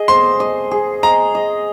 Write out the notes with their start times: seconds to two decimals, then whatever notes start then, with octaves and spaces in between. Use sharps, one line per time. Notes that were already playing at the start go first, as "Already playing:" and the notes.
Already playing: G#4 D#5
0.08 C5 C6
0.40 D#5
0.71 G#4
1.03 D#5 A#5
1.35 D#5